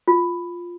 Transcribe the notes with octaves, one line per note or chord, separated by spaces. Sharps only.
F4